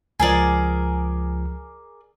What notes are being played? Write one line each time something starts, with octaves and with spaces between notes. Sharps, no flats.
C#2 F3 G#4 A#4 D5